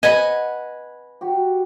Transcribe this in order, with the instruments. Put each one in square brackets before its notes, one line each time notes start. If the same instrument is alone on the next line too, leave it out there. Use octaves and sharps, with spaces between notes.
[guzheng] B4 F#5 G#5 [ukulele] D#5
[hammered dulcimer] F#4 G4